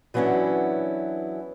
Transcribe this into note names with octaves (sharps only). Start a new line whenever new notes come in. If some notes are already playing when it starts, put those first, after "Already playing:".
E3 F#3 B3 C#4 D4 E4